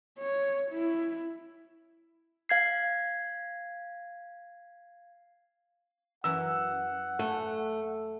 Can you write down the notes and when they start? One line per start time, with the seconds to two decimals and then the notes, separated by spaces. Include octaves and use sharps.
0.18 C#5
0.71 E4
2.49 F5 G#6 C7
6.24 F#2 E3 A#4 F#5 E6
7.19 A3 G#5